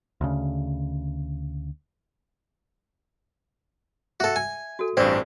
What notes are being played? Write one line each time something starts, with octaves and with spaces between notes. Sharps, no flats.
D2 C#3
F#4 A4 E5
G#5
F#4 A4
A1 G2 C4 D5